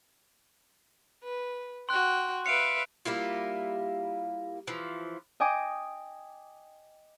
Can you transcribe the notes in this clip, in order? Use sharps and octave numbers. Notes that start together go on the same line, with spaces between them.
B4
F#4 G5 C6 F#6
B4 E5 F5 C#7 D7
G3 A#3 E4 F4
E3 F3
D#5 G5 G#5 D6 D#6